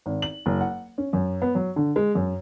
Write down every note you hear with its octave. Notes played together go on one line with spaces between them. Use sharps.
G#1
F#7
F#1
F#5
C#4
F#2
B3
F#3
D3
G#3
F#2